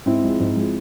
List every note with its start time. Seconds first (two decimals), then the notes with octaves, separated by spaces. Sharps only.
0.06 G#2 C4 E4
0.24 F3 G#3
0.40 G#2
0.56 F3 G#3